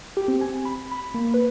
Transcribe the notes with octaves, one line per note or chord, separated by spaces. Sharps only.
G4
C4
G#5
B5
B5
A#3
B4